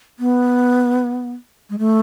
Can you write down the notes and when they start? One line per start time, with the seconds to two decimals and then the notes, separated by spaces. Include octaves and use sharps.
0.19 B3
1.70 G#3
1.79 A3